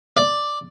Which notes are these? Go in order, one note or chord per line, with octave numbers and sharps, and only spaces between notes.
D5